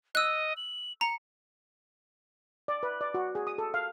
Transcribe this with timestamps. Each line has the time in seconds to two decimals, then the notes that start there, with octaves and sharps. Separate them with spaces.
0.15 D#5 E6 F#6
0.57 F#7
1.01 A#5 C#7
2.68 D5
2.83 B4
3.01 D5
3.14 F#4
3.35 G#4
3.47 D#6
3.58 A4
3.74 F5